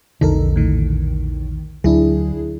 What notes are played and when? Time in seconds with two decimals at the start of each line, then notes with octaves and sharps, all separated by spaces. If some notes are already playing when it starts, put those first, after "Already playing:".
0.21 A#1 E2 D3 D#4 A4 A#4
0.56 A2 D#3
1.84 D2 D3 F#3 D4 E4 G#4